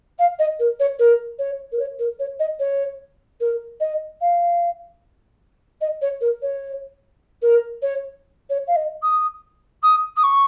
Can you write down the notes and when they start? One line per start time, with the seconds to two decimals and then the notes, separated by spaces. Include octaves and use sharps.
0.18 F5
0.39 D#5
0.59 A#4
0.79 C#5
0.99 A#4
1.38 C#5
1.72 A#4
1.79 C#5
1.99 A#4
2.19 C#5
2.39 D#5
2.59 C#5
3.40 A#4
3.80 D#5
4.20 F5
5.81 D#5
6.01 C#5
6.21 A#4
6.42 C#5
7.42 A#4
7.82 C#5
8.49 C#5
8.67 F5
8.76 D#5
9.02 D#6
9.82 D#6
10.16 D#6
10.23 C#6